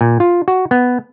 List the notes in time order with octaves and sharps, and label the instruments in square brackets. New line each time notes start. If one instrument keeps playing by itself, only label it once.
[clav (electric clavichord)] A#2
F4
F#4
B3